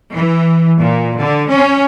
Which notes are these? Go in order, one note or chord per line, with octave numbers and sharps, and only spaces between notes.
E3
A#2
D3
C#4